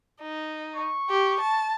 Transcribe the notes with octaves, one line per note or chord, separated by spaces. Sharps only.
D#4
C#6
G4
A5